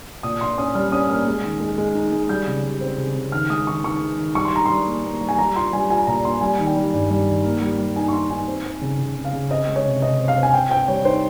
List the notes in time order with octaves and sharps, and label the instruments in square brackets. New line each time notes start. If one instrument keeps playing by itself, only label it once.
[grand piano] A#2 [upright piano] D#6
[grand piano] A#2 [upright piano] C6
[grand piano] C#4 [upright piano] D#6
[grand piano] G3 [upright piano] F6
[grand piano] C#4 [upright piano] D#6
[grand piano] A#3 [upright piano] F6
[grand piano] G#3
D#3
G#3
G#3
D#4
G#3
[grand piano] G3 [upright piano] G6
[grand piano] C#3
G3
C4
C#3
C#3
[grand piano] D#3 [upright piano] F6
[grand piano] G#3 [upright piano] D#6
[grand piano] D#3 [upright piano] C#6
[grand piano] D#3 [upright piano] C#6
[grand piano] G#3
D#3
[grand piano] G3 [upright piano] C#6
[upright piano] C6
[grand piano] G3 [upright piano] A#5
[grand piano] G3 [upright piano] C6
[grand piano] A#3
A#3
G3
[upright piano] G#5
[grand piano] G3 [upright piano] A#5
[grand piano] F4 [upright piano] C6
[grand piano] G3 [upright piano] G#5
[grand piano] F4 [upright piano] G#5
[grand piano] A#2 [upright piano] A#5
[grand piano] A#3 [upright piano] C6
[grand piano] G3 [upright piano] G#5
[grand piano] D#3
[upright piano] G5
[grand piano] G3
G2
G3
D#3
A#3
G3
G3
[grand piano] D#4 [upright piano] G#5
[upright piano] C#6
[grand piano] D#4 [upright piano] C6
[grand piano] D#4 [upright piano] G#5
[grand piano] C4
C4
C#3
C#3
C#3
[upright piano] F5
[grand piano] C#3
[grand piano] C4 [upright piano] D#5
[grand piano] G#3
[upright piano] C#5
[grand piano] C3
[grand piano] C3 [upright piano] D#5
[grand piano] C4
[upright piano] F5
[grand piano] C4
[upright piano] G#5
[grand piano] C4 [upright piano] G5
[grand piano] C4 [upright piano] G5
[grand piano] G3 [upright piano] C#5
[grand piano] D#4 [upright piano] C5